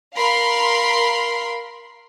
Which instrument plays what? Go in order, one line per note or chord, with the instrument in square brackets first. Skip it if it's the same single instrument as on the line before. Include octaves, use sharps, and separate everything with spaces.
[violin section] A#4 F5 B5 C6